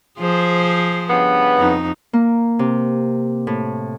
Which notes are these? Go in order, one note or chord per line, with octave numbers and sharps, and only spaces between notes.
F3 G#4 C5
G2 C#3 B3
F2 D#4
A#3
C3
A2